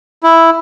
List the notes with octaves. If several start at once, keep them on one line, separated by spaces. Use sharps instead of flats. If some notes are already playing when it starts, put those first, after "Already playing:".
E4